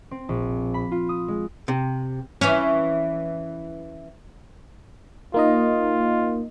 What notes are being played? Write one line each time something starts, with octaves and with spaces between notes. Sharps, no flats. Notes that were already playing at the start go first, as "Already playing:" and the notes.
C4
A#1
B5
F4
D#6
G#3
C3
E3 C#4
A#3 D#4 F4 D#5